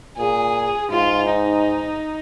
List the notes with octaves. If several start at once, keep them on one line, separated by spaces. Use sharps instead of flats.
A#2 G#4
G#2 F4
D#4